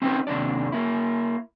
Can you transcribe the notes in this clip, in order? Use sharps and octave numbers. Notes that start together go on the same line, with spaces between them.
C4 C#4 D#4 G4 B4 C5
D#2 C3 F#3 D4 D5
A#3 E4